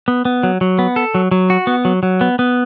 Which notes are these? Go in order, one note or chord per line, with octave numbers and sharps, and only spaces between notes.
B3
B3
F#3
F#3
B3
A4
F#3
F#3
F#4
B3
F#3
F#3
B3
B3